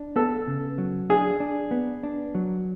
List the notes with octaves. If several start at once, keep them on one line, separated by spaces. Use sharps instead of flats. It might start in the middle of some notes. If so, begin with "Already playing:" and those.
Already playing: D4
B3 A4
C#3
F#3
D4 G#4
D4
B3
D4
F#3